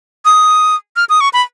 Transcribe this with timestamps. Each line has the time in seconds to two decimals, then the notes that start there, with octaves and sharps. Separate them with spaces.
0.25 D#6
0.96 F6
1.09 D#6
1.21 C#6
1.33 B5